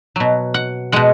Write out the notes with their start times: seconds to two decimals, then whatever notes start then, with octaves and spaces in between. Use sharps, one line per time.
0.16 B2 F#3
0.54 F#5
0.92 B2 G#3 F#5